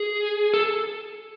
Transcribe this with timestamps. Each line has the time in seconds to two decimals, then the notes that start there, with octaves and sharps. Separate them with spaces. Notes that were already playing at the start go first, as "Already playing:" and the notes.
Already playing: G#4
0.54 A4